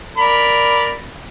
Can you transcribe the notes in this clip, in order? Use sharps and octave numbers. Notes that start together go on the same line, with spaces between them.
A#4 D5 B5